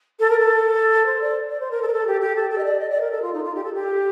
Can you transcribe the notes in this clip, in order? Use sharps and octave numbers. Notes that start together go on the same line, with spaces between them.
A4
A#4
A4
C5
D5
D5
C5
A#4
A4
A#4
A4
G4
G4
A4
A4
D#5
D5
D#5
D5
A#4
A4
F4
D#4
F4
G4
A4
G4